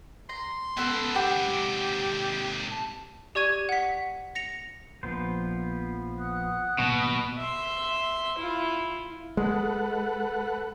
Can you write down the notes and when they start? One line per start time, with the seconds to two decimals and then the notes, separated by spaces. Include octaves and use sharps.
0.29 A#5 C6
0.77 C#2 B3 E4 A4
1.16 G4 F#5 G5 D6
1.48 G#2 C3
2.72 A5
3.35 G4 D5 C#6 G#6 D#7
3.69 F#5 B6
4.35 A#6 C#7 F7
5.03 A#1 F3 B3 C5
6.17 F#5 D#6 F#6
6.79 G#1 B2 F#3 A#3 F#4 B4
7.38 E5 C6
8.38 E4 F4
9.37 G#3 A4 B4 F#5